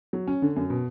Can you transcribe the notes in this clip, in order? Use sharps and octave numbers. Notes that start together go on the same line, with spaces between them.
F#3
C#4
D3
F#2
B2